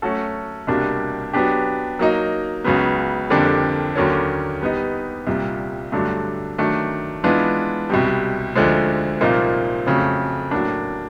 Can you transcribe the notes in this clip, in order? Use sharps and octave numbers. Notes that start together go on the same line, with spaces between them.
F#3 A3 C#4 F#4 A4
C2 B2 G3 A#3 D4
F#3 B3 D4 G4
F#3 A#3 D#4
C#2 C#3 F#3 B3
F2 D3 G3 A#3 D4
D#2 D3 F#3 A#3 C#4
G3 B3 D#4
C2 A#2 G3
G2 D3 F#3 A3 D4
D#3 F#3 A3 D4
E3 G#3 B3 D4 F4
C2 B2 G3
D2 D3 F3 G#3
C2 A#2 F3 A#3 D#4
F2 C#3 F#3 A3
A2 F#3 A#3 D4